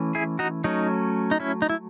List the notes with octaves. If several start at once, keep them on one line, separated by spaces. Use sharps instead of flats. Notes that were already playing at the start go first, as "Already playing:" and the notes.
Already playing: E3 A3 C#4
E4 G#4
D#4 F#4
F#3 A3 C#4 D#4
D#4
C#4 E4
D#4
E4